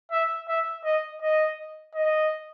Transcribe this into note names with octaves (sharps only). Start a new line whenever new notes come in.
E5
E5
D#5
D#5
D#5